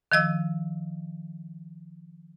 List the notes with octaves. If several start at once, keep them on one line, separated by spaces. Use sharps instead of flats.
D#3 F3 D#5 E6